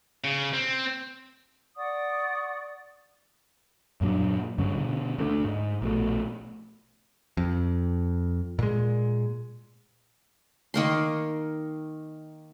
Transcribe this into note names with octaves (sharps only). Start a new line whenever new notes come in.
C#3
C4
D5 F#5 C#6 D#6
F#2 A#2 F#3 D4
G2 D3 C#4
B2 D3
D2 A3 B3 D4
G#2
A#1 B2 A3
F2
A#2 G#3
D#3 A#3 C6